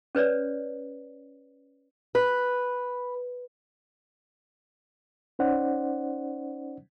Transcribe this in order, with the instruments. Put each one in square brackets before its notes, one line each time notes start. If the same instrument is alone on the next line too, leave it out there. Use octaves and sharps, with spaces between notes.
[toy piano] C#4 B4 C#5 D5
[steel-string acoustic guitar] B4
[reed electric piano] C#4 D#4 C5 D5 F#5